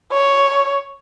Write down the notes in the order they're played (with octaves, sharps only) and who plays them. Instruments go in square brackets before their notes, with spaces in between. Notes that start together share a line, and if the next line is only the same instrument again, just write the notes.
[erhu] C#5